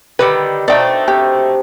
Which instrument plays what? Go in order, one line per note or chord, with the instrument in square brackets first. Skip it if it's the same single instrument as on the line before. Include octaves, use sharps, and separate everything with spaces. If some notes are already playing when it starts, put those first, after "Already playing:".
[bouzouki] D3 D#3 G3 [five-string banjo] B4
[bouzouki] B2 A3 [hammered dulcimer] D4 D#4 C5 [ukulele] D5 G5
[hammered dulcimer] C3 [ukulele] G4